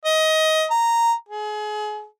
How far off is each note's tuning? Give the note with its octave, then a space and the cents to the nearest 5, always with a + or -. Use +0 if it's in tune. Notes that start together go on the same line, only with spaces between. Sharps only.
D#5 +20
A#5 -5
G#4 +30